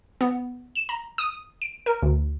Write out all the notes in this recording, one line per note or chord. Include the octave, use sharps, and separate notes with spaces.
B3
E7
A#5
D#6
D7
A#4
D2